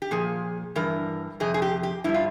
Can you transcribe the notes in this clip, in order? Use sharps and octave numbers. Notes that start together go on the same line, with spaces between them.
G4
A#2 F3 G#4
G2 E3 A#4
F2 C3 G#4
G#4
G4
G4
G2 G3 E4
F4